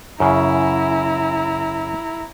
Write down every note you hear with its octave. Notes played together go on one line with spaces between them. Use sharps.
F#2 C#3 E4 A#5